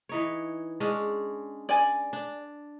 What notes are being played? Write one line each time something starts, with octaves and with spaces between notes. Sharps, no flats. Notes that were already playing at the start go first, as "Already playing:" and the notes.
E3 D#4 C#5
G#3 C#4 D4
D5 G#5
D4